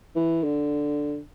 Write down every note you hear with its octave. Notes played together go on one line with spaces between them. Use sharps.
E3
D3